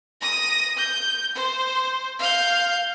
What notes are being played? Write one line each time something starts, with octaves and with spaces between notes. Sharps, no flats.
D#6 A#6
G6
C5
F5 G6